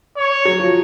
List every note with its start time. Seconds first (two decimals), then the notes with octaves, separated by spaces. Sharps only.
0.17 C#5
0.45 F#3
0.60 F3